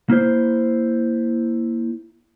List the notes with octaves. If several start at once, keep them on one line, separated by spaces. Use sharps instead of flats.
A#3 E4 C5